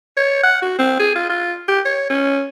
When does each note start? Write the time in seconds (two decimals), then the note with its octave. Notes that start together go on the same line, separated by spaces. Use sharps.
0.17 C#5
0.44 F#5
0.62 F#4
0.79 C4
0.99 G#4
1.16 F4
1.30 F4
1.68 G4
1.85 C#5
2.10 C#4